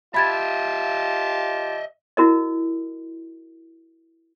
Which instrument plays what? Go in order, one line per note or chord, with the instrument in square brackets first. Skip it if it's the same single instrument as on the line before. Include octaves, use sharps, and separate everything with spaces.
[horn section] F4 G4 A5 [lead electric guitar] D#5 E5 [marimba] B5 G#6 A6
[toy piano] E4 F#4 A#4 D#5